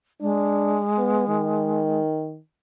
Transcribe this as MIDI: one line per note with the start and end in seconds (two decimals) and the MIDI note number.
0.21 2.01 56
0.21 0.79 62
0.98 1.26 59
1.28 2.39 51